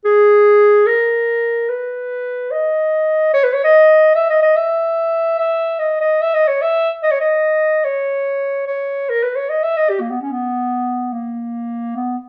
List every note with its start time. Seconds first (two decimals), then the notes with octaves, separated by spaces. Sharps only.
0.05 G#4
0.87 A#4
1.69 B4
2.51 D#5
3.34 C#5
3.44 B4
3.54 C#5
3.64 D#5
4.15 E5
4.30 D#5
4.42 D#5
4.56 E5
5.39 E5
5.79 D#5
6.01 D#5
6.21 E5
6.34 D#5
6.48 C#5
6.62 E5
7.03 D#5
7.12 C#5
7.21 D#5
7.85 C#5
8.67 C#5
9.10 A#4
9.23 B4
9.36 C#5
9.49 D#5
9.63 E5
9.77 D#5
9.90 G4
10.01 A#3
10.11 B3
10.22 C#4
10.32 B3
11.13 A#3
11.96 B3